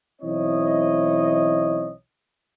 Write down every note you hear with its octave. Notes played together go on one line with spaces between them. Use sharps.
B1 E3 C4 E4 C#5 D#5